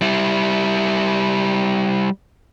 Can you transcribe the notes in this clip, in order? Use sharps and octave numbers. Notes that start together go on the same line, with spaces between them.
G3 E4